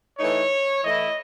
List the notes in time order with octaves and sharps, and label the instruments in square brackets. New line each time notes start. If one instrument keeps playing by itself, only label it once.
[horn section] E3 A3 D#4 C#5
E3 A3 E4 D#5